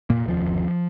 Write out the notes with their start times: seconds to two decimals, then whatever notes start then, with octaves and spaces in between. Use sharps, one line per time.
0.10 F1 A#2 A#3
0.28 D#2 F3
0.46 G1